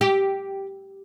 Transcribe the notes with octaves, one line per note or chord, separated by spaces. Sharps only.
G4